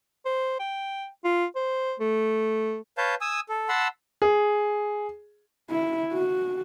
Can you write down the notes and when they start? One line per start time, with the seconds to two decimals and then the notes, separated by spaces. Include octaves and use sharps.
0.25 C5
0.60 G5
1.24 F4
1.56 C5
2.00 A3
2.98 B4 C#5 F5 A5 G6
3.21 G#5 D#6 E6
3.49 A4
3.69 F#5 A5 B5 C6 E6
4.22 G#4
5.70 E4
6.13 F#4